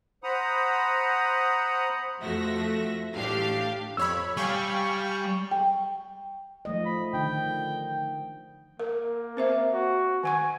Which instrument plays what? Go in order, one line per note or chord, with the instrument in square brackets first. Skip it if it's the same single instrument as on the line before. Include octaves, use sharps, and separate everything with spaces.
[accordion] C5 F#5 A#5 B5 D#6
[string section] F2 F3 A3 F#4 E5 A#6
A1 A2 D4 G4 F5 C7
[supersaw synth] F2 C#5 B5 [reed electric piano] E6
[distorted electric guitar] G3 [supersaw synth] F5 G5 G#5 [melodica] C#6
[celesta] G5
[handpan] F3 A3 D#5
[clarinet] B5
[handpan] D3 D#3 [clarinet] G5
[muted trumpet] A#3 [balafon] A#4
[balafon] C4 C5 E5
[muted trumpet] F#4
[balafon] D#3 F#5 C#6 [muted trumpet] G#5